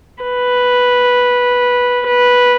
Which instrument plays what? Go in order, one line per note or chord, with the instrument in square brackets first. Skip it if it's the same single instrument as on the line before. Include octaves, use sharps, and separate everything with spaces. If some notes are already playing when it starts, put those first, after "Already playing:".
[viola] B4
B4